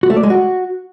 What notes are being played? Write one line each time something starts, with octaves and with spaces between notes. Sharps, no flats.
F#4
A3
D5
G#3
F#4